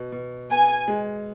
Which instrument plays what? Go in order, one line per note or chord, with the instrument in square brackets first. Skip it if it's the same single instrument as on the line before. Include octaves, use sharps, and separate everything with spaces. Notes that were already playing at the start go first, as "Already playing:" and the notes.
Already playing: [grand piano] B2
B2
[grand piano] B3 [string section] G#5
[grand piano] G#3